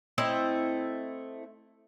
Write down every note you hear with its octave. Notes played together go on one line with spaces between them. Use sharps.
A3 C4 E4 D#5